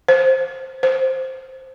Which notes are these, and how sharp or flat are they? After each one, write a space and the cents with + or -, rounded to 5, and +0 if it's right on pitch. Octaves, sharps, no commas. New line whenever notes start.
C5 +10
C5 +5